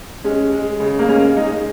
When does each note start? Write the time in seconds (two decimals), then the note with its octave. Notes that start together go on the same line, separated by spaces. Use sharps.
0.24 G#3 C#4
0.52 G#3
0.80 C#3
0.99 A#3
1.08 G#3 C#4
1.36 G#3 D#4